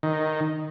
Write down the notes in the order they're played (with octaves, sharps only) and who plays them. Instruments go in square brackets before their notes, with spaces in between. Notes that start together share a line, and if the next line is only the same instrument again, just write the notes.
[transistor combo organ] D#3